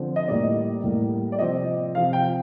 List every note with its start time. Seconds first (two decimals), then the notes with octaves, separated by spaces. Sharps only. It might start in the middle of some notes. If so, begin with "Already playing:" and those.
Already playing: D3 F3 C4
0.16 D#5
0.28 A2 G3 A#3 D5
0.83 A2 G3 A#3
1.32 D5
1.39 C3 F3 C4 D#5
1.95 C3 F3 C4 F5
2.13 G5